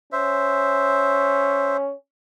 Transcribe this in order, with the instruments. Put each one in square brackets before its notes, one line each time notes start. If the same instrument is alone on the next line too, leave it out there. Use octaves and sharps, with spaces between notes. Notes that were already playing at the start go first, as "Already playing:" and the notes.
[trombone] C#4 [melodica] C5 E5